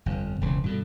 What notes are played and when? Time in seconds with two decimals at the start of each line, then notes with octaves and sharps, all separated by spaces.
0.06 G1 F2
0.41 E1 C#2 E3
0.63 G2 B2 D3